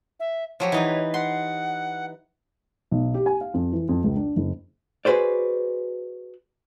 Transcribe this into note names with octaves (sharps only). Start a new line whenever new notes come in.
E5
F3 F#3 G4 C#5
E3 D#4 B4
F#5 C6
B1
G4
G#5
F5
F2
E3
F2
C#2
D4
F#1
F#4 G#4 B4 C5 D5